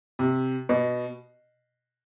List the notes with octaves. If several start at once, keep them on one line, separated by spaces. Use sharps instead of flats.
C3
B2